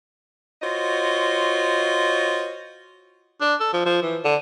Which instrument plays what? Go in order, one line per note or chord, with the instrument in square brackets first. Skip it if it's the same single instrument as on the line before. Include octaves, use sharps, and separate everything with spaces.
[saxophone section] F4 F#4 C5 C#5 D#5
[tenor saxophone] D4
A4
F3
F3
E3
D3